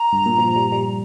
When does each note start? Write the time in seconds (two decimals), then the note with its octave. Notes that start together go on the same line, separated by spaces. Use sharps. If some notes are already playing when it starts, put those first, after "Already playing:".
Already playing: A#5
0.13 G2
0.26 A#2
0.38 F3
0.56 G3
0.72 G3